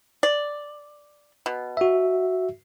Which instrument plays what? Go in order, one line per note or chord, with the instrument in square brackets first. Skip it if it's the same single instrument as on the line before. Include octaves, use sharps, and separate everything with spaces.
[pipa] D5
B2
[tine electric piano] F#4 E5